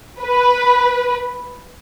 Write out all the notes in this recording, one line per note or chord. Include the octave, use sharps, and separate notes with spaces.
B4